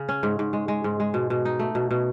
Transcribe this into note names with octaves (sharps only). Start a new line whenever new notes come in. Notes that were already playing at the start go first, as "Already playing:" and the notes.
Already playing: C#3
C#4
G#2
G#2
G#3
G#3
G#2
G#3
B2
B2
D#4
A3
B2
B2